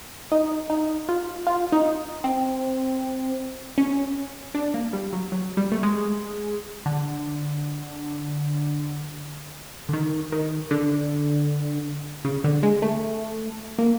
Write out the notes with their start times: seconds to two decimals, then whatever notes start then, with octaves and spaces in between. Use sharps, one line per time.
0.32 D#4
0.70 D#4
1.09 F4
1.47 F4
1.72 D#4
2.24 C4
3.78 C#4
4.55 D4
4.74 A#3
4.93 G3
5.13 F#3
5.32 F#3
5.57 G3
5.72 A3
5.83 G#3
6.86 D3
9.89 D3
9.93 D#3
10.32 D#3
10.71 D3
12.25 C#3
12.44 D3
12.63 G#3
12.82 A3
13.79 A#3